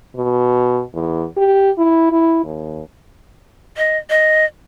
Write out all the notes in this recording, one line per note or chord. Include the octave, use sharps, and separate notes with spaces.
B2
E2
G4
E4
E4
D#2
D#5
D#5